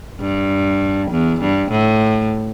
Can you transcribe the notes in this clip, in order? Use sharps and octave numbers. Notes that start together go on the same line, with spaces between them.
G2
E2
G2
A2